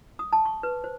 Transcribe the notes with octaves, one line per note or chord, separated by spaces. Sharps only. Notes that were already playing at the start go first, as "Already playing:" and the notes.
D#6
A5
C#6
B4
C5